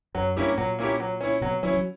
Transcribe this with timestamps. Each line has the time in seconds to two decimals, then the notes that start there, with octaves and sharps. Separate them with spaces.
0.15 F#2 F#3
0.36 G2 A#3 C#4 E4 G4
0.58 A#2 F#3
0.79 A#3 C#4 E4 G4
1.00 F#3
1.21 C#4 E4
1.41 B2 F#3
1.63 F#3 C#4 E4
1.74 F#3